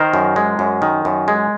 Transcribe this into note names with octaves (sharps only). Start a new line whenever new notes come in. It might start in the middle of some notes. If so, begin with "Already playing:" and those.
Already playing: D#3 A#4 C5
F#2
G#3
F#2
D#3
F#2
G#3